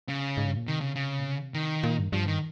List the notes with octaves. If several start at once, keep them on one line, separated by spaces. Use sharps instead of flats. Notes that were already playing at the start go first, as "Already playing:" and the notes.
C#3
G#2
G2
A#2
C3 D#3
C#3
C#3
A#2
C3
D#3
A#2
G2
G2 F3
D#3